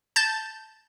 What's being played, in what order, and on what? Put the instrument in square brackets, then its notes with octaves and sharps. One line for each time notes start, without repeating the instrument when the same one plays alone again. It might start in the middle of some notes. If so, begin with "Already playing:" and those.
[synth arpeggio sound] A5 G6 A6